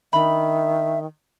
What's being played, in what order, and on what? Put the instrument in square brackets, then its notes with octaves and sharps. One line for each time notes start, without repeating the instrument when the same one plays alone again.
[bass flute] D#3 [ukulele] D4 B5 [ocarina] E5